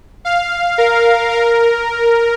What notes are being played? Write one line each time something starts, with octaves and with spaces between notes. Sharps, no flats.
F5
A#4
A#4